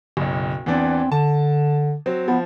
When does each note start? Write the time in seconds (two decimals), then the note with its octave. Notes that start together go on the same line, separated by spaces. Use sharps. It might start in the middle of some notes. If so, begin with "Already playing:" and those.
0.17 F#1 B1
0.66 E2 E3 C4 D4
1.12 D3 A5
2.06 F#3 C4
2.28 F3 B3